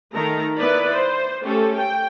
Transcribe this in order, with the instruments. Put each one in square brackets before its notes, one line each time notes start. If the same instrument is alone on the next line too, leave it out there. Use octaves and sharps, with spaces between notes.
[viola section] D#3 A3 A4 A#4 A#5
B3 E4 B4 D5 B5
C5
A3 C#4 G4 A4
G5